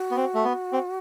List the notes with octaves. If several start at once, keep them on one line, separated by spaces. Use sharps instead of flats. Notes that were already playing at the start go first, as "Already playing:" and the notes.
Already playing: F#4
B3
C4
A3
B3
C4